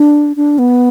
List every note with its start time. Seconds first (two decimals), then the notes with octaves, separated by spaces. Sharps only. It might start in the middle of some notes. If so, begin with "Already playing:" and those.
Already playing: D4
0.36 D4
0.59 B3